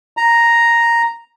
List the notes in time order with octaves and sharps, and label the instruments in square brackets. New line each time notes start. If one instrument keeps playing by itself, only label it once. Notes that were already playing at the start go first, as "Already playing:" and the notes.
[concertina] A#5